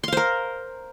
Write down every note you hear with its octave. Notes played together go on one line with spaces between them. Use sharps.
A#4 C5 F5 C6